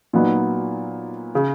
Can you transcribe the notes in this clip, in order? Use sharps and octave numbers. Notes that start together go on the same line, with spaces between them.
A#2 F#3 B3 D#4
C#3